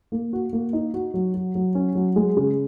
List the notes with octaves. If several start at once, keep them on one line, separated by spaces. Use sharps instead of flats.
A#3
F#4
A#3
D#4
F#4
F#3
F#4
F#3
C#4
F#3
G#3
C#3